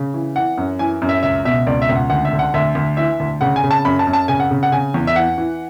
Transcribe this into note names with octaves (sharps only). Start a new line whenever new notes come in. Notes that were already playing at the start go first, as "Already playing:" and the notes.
Already playing: C#3
E3
E3 F#5
F#2
E3 G#5
F#2
E5
C#2 E5
B2 E5
C#2 D5
E5
C#2
F#5
D2 F#5
E5
D3
F#5
D2 E5
D2
E3 E5
D2
C#3 F#5
G#5
C#3
A5
F#2 B5
A5
F#2
A5
C#3 G#5
F#5
C#3
F#5
C#3 G#5
E2
E5
E3 F#5
E3